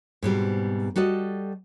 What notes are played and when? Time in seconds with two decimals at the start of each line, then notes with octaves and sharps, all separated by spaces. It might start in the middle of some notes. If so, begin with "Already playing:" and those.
0.23 G#2 B2 G3 C4
0.96 G3 F#4 A4 D#5